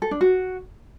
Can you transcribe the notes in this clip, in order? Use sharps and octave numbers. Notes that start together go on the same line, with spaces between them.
A4
D4
F#4